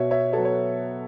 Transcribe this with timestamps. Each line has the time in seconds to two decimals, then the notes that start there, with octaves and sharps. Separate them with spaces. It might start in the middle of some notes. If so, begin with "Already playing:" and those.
Already playing: B2 C#5 E5
0.11 C#5 E5
0.33 F#3 B3 A4 C#5
0.45 C#5